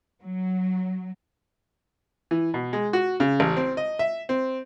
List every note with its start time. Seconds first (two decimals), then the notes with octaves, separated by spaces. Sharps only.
0.23 F#3
2.31 E3
2.54 B2
2.73 G#3
2.93 F#4
3.20 C#3
3.40 A1
3.57 C4
3.77 D#5
3.99 E5
4.29 C4